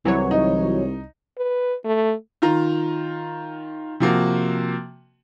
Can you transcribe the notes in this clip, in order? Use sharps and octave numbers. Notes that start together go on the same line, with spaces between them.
C2 E3 F#3 C#5
D#4
B4
A3
D#3 F4 A#5
C3 F3 A#3 F#4